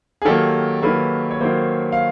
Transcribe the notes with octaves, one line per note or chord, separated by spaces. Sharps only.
G#4
D#3 F#3 A#3 G4 A4
D#3 F#3 A#3 A4 B4
C#5
D#3 F#3 A#3 A#4 C5
F5